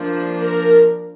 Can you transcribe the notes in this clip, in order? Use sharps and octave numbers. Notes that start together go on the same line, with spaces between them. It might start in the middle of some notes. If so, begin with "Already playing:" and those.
Already playing: F3 A#3 D4
A#4